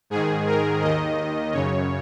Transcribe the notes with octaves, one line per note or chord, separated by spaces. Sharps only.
G#2 D#3 G#4
A#4
D#2 D#3 D#5
F#2 C#3 C#5